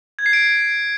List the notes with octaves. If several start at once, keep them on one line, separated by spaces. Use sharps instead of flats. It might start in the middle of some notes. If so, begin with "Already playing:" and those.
G#6
C7
D7